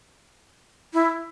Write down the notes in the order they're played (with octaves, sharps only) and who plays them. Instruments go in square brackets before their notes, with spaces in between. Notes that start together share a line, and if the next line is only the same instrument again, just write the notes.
[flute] E4